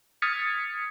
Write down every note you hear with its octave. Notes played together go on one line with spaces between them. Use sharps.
D#6 F6 G#6 A6 B6 C#7